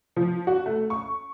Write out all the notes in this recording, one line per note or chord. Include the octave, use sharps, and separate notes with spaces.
F3
F#4
A3
C#6